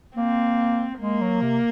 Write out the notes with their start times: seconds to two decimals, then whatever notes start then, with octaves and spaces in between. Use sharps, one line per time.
0.17 A#3 C4
1.00 G#3 A#3
1.21 F#3
1.42 C3